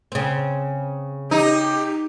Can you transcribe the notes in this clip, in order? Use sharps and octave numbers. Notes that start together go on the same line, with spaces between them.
C#3 C4
D#4 G4